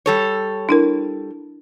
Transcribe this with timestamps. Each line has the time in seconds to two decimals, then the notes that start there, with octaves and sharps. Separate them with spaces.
0.06 G3 A4 C#5
0.69 D4 E4 A#4